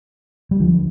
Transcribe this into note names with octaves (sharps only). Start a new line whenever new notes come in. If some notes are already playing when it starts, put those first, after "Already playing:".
G3
D2 D3 F3